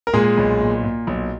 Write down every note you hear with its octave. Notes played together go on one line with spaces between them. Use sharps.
A#4
A#2 G#3 G#4
B1
A#2
A#2
B1